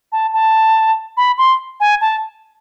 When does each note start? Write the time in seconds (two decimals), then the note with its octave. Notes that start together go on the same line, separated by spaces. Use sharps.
0.12 A5
0.33 A5
1.17 B5
1.38 C6
1.80 G#5
2.01 A5